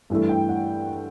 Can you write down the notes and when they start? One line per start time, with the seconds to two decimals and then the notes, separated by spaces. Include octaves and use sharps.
0.10 G2 E3 A3
0.29 G5
0.49 F#5